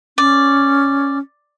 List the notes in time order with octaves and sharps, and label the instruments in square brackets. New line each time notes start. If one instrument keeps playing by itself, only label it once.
[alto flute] C#4 [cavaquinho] D5